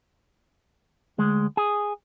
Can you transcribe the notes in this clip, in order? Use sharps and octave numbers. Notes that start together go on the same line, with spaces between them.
D2 G#3
G#4